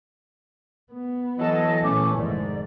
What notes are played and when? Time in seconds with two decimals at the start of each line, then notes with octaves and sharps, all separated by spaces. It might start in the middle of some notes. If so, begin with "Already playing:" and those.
0.92 B3
1.39 E3 F#3 A4 D#5 A5
1.84 A#2 A3 C#4 D6
2.18 F1 G#2 D#3 D5